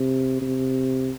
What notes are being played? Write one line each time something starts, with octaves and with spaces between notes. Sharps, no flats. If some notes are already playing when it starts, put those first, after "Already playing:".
Already playing: C3
C3